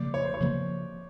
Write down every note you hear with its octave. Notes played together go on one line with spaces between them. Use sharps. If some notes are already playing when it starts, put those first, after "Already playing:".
Already playing: C#3 F3 A#3 D5
C#5
C5
C#5
C#3 F3 A#3